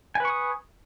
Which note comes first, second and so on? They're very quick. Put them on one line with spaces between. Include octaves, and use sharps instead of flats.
G#5 B4 C#6 D#6